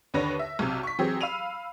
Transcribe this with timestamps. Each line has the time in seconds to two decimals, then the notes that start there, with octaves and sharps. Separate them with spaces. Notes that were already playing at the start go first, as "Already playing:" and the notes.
0.14 D#2 D3 B4 C#5 A#6
0.39 E5
0.59 B1 C3
0.83 C#6 B6
0.98 E3 F#3 C4 G4 G#4
1.21 F5 B5 E6 D#7 F7